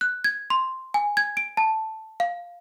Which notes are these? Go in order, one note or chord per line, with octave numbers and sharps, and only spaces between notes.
F#6
G#6
C6
G#5
G#6
D7
A5
F5